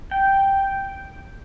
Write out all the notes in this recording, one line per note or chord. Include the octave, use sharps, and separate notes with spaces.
G5